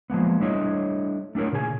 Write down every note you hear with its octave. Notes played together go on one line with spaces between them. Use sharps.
F3 G#3 A#3 B3
G3 A3 D4 E4 C#5 D#5
A3 D4 E4 A#4 C#5
A#2 C#3 G#4 A4 G#5